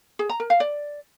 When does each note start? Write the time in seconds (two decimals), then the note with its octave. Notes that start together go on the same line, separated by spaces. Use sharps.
0.19 G#4
0.29 A#5
0.40 A#4
0.50 F5
0.60 D5